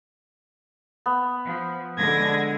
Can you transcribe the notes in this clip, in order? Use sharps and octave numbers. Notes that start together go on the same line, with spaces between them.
B3
F3
D3 G#3 G#6 A#6